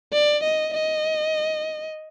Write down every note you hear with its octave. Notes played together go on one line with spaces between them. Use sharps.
D5
D#5
D#5